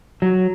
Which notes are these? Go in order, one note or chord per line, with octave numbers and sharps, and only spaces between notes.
F#3